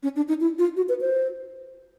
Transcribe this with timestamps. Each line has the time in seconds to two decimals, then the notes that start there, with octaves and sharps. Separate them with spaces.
0.03 C#4
0.16 D4
0.28 D#4
0.40 E4
0.59 F4
0.77 F#4
0.89 B4
1.01 C5